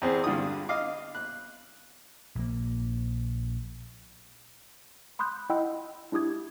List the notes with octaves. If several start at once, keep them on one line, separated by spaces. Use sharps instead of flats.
E2 C4 G#4
G2 D3 F4 D#6
D#5 F5 D6
F#6
A#1 A#3
B5 C6 D#6 F#6 G6
E4 D#5 F#5 G5 B5 E6
D4 E4 G4 D#6 G#6